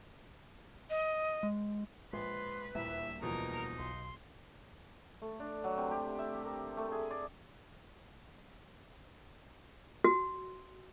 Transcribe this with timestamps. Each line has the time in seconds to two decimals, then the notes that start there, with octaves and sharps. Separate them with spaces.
0.90 D#5
1.43 G#3
2.13 A#1 G#3 B4 C6
2.75 D#1 D2 G3 A#3 E4 E5
3.22 E2 B2 F3 D#4 A#4
3.79 B1 C6
5.22 A3
5.40 D4
5.64 F#3
5.77 C3
5.91 G4
6.19 E5
6.34 G4
6.45 A#4
6.77 A3
6.92 G#4
7.11 D5
10.04 F#4